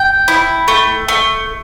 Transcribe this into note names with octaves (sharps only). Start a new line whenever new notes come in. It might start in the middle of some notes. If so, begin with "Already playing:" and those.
Already playing: G5
E4
A3
A3